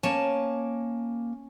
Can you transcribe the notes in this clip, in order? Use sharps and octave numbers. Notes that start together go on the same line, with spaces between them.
A#3 C#4 A5